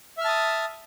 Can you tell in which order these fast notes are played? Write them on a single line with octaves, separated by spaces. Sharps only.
E5 F6 A5 D#6